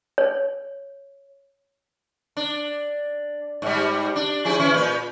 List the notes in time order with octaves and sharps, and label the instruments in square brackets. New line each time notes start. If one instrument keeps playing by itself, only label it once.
[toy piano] C#5
[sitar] D4
G#2 G3
D4
F3 E4 G#4
E3 C#4 E4
A#2 B4